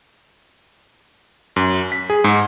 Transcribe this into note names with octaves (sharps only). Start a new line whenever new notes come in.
F#2
B6
G#4
G#2